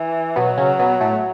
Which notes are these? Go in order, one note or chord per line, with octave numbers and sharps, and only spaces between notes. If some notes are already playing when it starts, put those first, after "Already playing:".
Already playing: E3
B2 F#3 B3
C#3 C#4
B2 B3
A2 A3